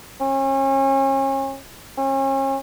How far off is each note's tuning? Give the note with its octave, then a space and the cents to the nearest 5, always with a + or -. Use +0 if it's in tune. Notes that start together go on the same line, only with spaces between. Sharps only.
C#4 -35
C#4 -40